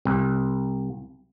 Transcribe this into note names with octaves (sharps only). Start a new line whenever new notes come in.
C2